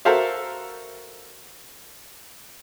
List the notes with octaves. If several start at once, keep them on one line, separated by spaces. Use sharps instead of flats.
F#4 A4 A#4 C5 E5 F5